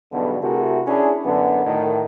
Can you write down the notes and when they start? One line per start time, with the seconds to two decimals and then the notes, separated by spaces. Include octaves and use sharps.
0.12 B1 E2 G2 B2 D3
0.41 C3 A3 E4 F#4 G#4 A#4
0.87 C#4 D4 E4 G#4
1.25 F#2 D3 B3
1.66 A2 D#3